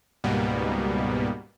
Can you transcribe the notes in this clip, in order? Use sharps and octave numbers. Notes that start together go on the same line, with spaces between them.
C#2 G#2 B2 G3 A#3 B3